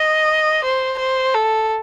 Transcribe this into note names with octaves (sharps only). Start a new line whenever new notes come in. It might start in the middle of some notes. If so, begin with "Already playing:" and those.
Already playing: D#5
C5
C5
A4